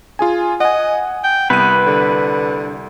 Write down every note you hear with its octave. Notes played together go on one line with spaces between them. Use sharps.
F4 G#4 G#5
D#5 F#5 G#5
G5
C2 B3 B4 D#7
D3